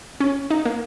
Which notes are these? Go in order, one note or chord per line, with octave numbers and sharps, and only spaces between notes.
C#4
D#4
A#3